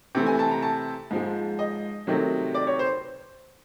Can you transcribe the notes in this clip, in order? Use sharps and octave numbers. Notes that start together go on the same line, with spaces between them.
C3 E3 A3
G#5
A5
A#5
A5
G#2 F3 G#3
D#5
C3 D#3 F#3 A3
D5
C#5
C5